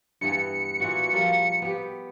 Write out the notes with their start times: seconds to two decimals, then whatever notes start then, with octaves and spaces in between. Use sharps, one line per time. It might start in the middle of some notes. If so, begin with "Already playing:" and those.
0.21 G2 E3 B3 C#7
0.80 A#2 E3 F#4
1.13 F3 G3 A#3
1.62 B3 G4